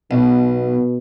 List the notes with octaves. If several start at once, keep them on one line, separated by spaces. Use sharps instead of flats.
B1 B2